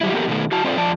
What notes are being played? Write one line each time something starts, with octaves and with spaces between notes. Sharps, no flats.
F#3 G3 E4
A#3 B3 G4 A4 A#4
B2 D#3 A3
E4 F#4 A5
C4 F4 A4 C5 D5
F2 F3 D5 A5